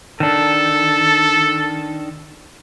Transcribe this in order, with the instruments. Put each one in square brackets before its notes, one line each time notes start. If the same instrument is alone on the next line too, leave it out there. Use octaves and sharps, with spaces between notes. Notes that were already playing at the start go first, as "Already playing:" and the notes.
[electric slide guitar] D#3 D4 [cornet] A4